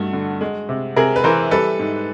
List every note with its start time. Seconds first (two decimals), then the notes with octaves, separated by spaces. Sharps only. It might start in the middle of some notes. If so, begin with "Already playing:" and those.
Already playing: G2 A3 F#4
0.13 D3
0.41 G#3
0.69 C3
0.96 C3 G#4 A#4
1.16 B4
1.24 E3 A#4 C5
1.51 G3 A4 B4
1.79 G#2